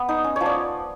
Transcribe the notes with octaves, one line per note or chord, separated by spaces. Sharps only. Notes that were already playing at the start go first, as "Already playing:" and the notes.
Already playing: B3
D#4
C#4
F3 C#5
D5